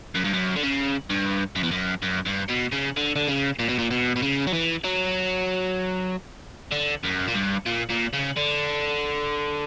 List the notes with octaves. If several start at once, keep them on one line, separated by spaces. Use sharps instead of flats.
F#2
G2
F#2
D3
C#3
G2
F#2
E2
F#2
F#2
G2
B2
C#3
D3
D3
C#3
A#2
B2
A#2
B2
B2
C#3
F#3
E3
F#3
D3
F#2
A#2
G2
A#2
A#2
C#3
D3